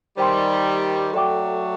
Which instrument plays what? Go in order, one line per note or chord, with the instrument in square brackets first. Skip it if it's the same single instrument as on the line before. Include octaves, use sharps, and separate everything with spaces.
[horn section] D#3 G3 [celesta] C5 G5 C6
[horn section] F#3 A3 [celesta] A4 D5 G5 D6